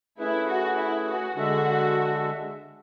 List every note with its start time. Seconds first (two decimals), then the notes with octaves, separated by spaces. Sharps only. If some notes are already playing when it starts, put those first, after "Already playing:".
0.18 A3 C#4 E4 G#4 B4
0.48 F#4
0.77 E4
1.07 F#4
1.36 D3 G#3 D4 F#4 A4 E5